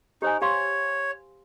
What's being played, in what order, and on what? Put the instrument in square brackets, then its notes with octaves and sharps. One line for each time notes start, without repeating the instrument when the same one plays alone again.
[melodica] D#4 [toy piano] G4 C5 G#5
[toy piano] G4 F5 C6 [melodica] C#5